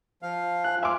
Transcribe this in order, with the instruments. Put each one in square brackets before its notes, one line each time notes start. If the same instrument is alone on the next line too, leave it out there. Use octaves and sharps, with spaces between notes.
[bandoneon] F3 F5
[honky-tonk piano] F4 G#5 [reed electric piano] F#6
[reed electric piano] E5 D6 [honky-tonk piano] G#5 C6 F6